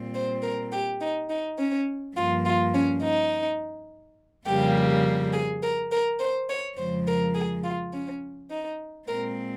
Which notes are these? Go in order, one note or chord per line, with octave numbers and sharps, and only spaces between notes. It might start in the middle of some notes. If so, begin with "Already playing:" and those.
Already playing: A#2 G3 C4
C5
A#4
G4
D#4
D#4
C#4
G2 F3 A#3 F4
F4
C#4
D#4
F2 C#3 G3 A#3 G4
G#4
A#4
A#4
C5
C#5
F2 C#3 F3 G#3 C5
A#4
G#4
F4
C#4
D#4
A#2 G#3 C4 A#4